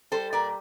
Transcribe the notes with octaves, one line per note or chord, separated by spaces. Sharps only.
G3 A4 C5
A#2 A#4 D5